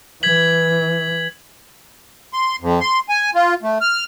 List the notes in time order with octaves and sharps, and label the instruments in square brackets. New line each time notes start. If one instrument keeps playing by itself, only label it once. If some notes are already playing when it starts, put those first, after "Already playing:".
[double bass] E3 [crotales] G#6 B6 F#7
[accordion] C6
F2
C6
G#5
F4
A3
F6